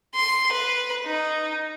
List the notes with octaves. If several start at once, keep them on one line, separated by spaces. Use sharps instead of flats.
C6
B4
D#4